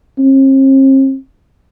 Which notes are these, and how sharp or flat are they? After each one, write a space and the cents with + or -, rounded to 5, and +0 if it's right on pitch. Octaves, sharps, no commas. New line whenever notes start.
C4 +45